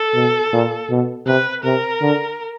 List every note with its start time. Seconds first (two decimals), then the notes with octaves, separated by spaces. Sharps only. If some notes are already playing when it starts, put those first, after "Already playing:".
Already playing: A4
0.14 B2
0.53 A#2
0.90 B2
1.26 C3 B4
1.64 C3 A#4
2.01 D3